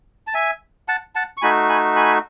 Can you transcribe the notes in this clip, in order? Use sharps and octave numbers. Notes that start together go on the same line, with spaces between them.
A5
E5 G#5
F#5 A5
F#5 A5
C#6
A3 D#4 F#4 G#5 B5
G#5 B5
G#5 B5